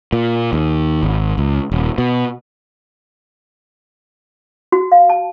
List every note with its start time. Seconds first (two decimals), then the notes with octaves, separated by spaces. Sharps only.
0.13 A#2
0.53 D#2
1.03 G#1
1.38 C#2
1.72 D#1
1.98 B2
4.72 F#4
4.92 F5
5.10 A5